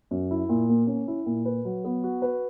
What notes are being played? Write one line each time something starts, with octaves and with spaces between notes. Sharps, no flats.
F#2
E4
A#2
A#3
C#4
E4
A#2
B4
F#3
B3
F#4
B4